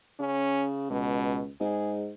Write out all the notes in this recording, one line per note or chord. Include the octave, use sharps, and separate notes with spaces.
C#3 C#4
C#2 B2
G#2 G#4